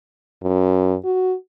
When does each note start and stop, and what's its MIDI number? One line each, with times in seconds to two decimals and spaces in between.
0.42 0.95 42
1.04 1.34 66